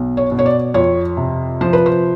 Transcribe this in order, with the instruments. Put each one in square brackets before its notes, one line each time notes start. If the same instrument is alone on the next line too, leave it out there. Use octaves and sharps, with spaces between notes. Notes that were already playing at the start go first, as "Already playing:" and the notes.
Already playing: [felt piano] B1
C#5
B2
C#5
D5
F2 C#5
C3
F3 C5
B4
C5